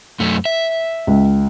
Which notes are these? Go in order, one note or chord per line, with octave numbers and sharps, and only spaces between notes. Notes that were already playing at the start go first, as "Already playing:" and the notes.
F#2 A3
E5
C#2